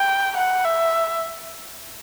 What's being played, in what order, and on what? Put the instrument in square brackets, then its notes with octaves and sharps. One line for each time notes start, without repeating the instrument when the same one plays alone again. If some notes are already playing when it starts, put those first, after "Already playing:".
Already playing: [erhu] G5
F#5
E5